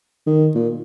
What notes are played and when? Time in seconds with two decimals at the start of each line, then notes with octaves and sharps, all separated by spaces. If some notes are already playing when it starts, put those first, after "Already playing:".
0.27 D#3
0.55 A#2